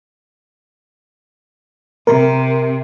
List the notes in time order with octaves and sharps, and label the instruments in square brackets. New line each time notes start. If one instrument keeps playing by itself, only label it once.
[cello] C3 [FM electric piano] A#4